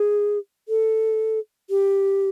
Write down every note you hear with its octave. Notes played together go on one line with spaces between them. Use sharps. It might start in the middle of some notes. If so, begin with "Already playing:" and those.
Already playing: G#4
A4
G4